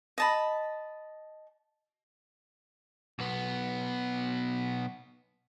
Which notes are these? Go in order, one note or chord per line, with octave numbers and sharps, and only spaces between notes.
D#5 A5 B5
B1 B3